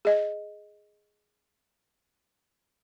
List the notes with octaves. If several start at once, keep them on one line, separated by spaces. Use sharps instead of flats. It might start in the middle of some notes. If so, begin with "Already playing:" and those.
G#4 D#5